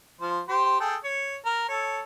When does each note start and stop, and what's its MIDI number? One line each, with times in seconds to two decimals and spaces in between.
0.21 0.40 53
0.21 0.40 72
0.49 0.79 67
0.49 0.79 72
0.49 0.79 84
0.80 0.96 68
0.80 0.96 69
0.80 0.96 79
1.04 1.37 73
1.45 1.66 70
1.69 2.01 69
1.69 2.01 73